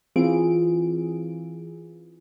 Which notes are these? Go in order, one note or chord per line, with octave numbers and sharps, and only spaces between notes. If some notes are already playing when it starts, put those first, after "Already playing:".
E3 C4 F4 G#4 D7